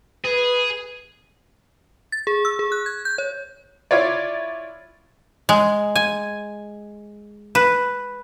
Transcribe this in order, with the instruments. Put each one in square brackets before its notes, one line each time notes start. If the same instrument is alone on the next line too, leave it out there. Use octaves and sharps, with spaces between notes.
[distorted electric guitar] G#4 [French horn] B4
[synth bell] A6
G#4
E6
G#4
F#6
G#6
G6
C#5
[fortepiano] E4 F4 C#5 D5
[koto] G#3
G#5
B4